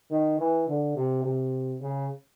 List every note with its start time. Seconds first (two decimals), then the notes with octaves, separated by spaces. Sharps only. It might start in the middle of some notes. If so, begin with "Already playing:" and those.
0.11 D#3
0.39 E3
0.67 D3
0.95 C3
1.24 C3
1.81 C#3